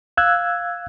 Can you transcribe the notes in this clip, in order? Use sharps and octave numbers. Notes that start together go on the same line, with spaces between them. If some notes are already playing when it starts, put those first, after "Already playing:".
F5 E6 F#6 G#6